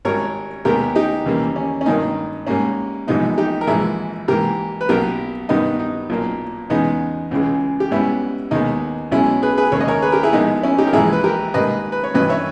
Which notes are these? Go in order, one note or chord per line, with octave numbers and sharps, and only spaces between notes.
G#1 G#2 G3 A#4 C#5
D#2 D#3 G#3 B3 G4 A#4
D#4 G4
D#2 C#3 E3 G3 A#3
C#4
C#4
G#1 G2 D#3 A#3 D#4
G#2 G3 A#3 C#4
A#1 G#2 E3 G3 B3 D#4
D#4 G4
A#4
A#1 G#2 E3 E4 G#4
G#2 E3 A#3 G4 A#4
B4
B1 B2 A#3 G4 A#4
G2 D#3 G3 B3 D#4
D#4
B1 A#2 A#3
E2 C#3 G#3 B3 D#4
C#2 C#3 E3 G#3
G4
G#2 G3 B3 C#4 E4
D#2 D#3 G#3 B3 D#4
B1 B2 G#3 C#4 E4
G#4 B4
G#4 B4
D#2 C#3 G#3 C#5
D#5
A#4 C#5
G#4 B4
G4 A#4
E4 G#4
A#1 A#2 G#3 B3 D#4
C#4 E4
D#4 G4
A#4
A#1 G#2 E3 E4 G#4
B4
G4 A#4
G#2 D#3 G3 A#3 B4 D#5
B4
C#5
G#1 G2 E3 B4 D#5
C#5 E5